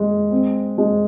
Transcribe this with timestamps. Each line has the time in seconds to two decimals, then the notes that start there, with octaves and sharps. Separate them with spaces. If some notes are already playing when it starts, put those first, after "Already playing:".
Already playing: G#3
0.31 C4
0.78 G#3